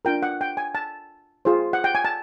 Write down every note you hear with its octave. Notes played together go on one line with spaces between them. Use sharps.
D4 F4 A#4 G5
F#5
G5
G#5
A5
F4 G#4 C5
F#5
G5
G#5
A5